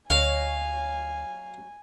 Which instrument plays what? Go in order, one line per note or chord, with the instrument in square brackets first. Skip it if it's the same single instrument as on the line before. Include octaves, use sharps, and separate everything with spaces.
[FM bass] D2 [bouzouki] F#3 C#5 D#5 [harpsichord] F5 [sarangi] G#5